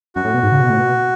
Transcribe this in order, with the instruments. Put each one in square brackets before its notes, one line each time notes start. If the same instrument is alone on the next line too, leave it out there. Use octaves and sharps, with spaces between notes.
[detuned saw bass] F#2 [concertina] F#4
[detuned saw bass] A2
B2
G#2
C#3
B2
A2
B2